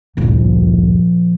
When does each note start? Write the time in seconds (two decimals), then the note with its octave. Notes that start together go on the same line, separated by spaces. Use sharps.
0.17 A1 D2 G2 A#2 F3